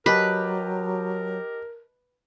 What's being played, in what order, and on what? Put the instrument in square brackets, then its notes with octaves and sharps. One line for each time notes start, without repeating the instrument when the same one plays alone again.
[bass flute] F#3 [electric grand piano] G4 D#5 A5 [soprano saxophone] A#4 [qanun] B4